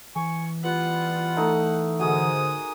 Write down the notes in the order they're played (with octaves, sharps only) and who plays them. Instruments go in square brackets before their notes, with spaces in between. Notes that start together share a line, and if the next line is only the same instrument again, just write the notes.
[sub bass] E3 [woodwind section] G#5 C#6
[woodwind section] G3 B3 F4 [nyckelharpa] F#5
[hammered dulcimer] A3 D#4
[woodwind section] G#2 D3 [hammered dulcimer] F#4 G#4 A#4 [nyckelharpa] D#6